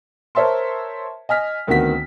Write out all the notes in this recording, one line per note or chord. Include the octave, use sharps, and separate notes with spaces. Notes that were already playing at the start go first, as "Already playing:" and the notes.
A#4 C5 C#5 E5 A5 C6
D#5 G#5 F6 B6
D2 D#3 B3 C4 F#4 B6